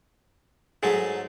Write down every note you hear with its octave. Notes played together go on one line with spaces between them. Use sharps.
G#2 F#3 A3 G#4